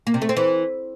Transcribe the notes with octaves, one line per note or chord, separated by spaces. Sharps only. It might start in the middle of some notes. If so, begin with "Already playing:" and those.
A#3
C3
A3
C4
E3